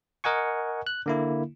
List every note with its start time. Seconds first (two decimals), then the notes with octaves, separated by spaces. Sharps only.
0.24 A#4 D#5 F#5 G#5 C#6
0.87 F#6
1.06 D3 A#3 E4